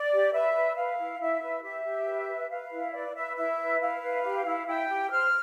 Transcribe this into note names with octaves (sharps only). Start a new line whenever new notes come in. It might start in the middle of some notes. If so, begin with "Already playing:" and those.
Already playing: D5
G4
B4 E5
B4
B4 F5
E4
E4 E5
B4
G4 E5
G4
B4
B4
B4 F5
E4
B4 D5
B4 E5
E4 E5
B4
E4 F5
B4
G4
E4
E4 G5
G4
C5 F6